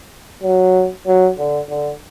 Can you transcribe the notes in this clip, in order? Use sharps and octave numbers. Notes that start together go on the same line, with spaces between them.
F#3
F#3
D3
D3